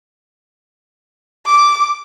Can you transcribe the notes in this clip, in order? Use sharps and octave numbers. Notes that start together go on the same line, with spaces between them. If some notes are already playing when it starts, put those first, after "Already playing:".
D6